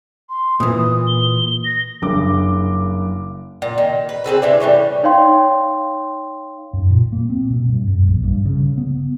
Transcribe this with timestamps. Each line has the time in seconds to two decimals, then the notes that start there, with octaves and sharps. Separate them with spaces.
0.29 C6
0.60 A#2 E3 D#6
1.07 G7
1.65 A#6
2.02 F#1 G2 D6
3.62 A#2
3.78 D#3
4.09 B4
4.24 C4 G#4 A4 B4
4.42 C3 E3 D4
4.60 A2 E3 G3 C#4
5.03 D#4 C#5 F5 G5 C6
6.73 F#2
6.90 A#2
7.12 A#3
7.30 C4
7.50 B2
7.68 G2
7.87 F#2
8.08 A#1
8.24 G2
8.45 C#3
8.78 B3